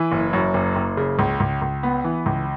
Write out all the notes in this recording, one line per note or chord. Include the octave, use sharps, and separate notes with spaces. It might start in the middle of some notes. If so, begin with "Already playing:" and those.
Already playing: E3
F#1
F#2
F#1
F#1
C#3
C#2
C#2
C#2
B3
E3
C#2